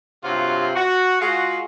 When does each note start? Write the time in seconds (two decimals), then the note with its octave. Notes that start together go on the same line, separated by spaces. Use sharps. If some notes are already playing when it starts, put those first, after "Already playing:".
0.24 G2 C3 F#3 F4
0.76 F#4
1.22 G#3 F4 F#4